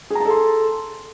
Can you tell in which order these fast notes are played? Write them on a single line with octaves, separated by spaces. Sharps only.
G#4 A#5 A5 A4 C6